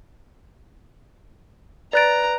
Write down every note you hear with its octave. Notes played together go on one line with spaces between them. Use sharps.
B4 D5 A#5 F#6 A6 D7